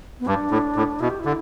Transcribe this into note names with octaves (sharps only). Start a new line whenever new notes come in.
B3
G2 D4
A2
A2
B2 E4
G4
E4
D3